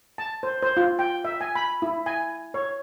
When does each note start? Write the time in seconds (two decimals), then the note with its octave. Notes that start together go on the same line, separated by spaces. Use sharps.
0.18 A5
0.43 C5
0.63 C5
0.77 F4
0.99 G5
1.25 E5
1.41 G#5
1.55 B5
1.82 E4
2.06 G#5
2.54 C#5